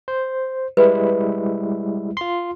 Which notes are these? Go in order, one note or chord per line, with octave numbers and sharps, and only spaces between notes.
C5
G3 G#3 E4 B4
F4 C6